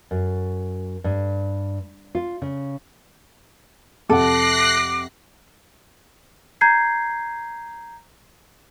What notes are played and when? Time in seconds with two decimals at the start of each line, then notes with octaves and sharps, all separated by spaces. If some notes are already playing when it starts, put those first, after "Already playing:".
0.11 F#2
1.04 G2
2.15 F4
2.42 C#3
4.10 F2 C3 A4 F#5 D6 F#6 A#6 C7
6.61 A#5 G6 G#6 C7